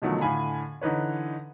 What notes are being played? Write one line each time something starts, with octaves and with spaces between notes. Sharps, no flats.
B2 D3 D#3 F3 F#3 A3
A2 D3 F5 G#5 B5
D3 E3 D#4 B4 C#5